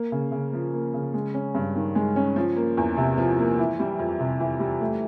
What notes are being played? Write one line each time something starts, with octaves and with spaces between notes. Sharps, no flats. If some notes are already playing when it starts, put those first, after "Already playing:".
Already playing: A#3
C#3
C#3
F3
A#3
C#3
G#3
C#4
G2
D#3
G#3
C#4
F3
A#3
E2
C3
F3
A#3
E3
G3
F2
C3
E3
G3
A3